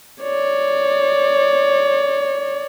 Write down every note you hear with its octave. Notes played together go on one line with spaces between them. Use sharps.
C#5 D5